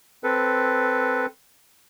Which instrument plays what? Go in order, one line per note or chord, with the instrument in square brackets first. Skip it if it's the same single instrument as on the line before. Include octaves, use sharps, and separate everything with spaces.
[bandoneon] C4 A4 B4